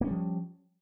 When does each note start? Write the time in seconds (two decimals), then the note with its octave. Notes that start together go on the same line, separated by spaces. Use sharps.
0.01 A#3
0.04 C#4
0.07 G3
0.10 F3